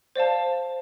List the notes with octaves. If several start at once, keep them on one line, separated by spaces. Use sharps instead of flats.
C5 D5 F5 A5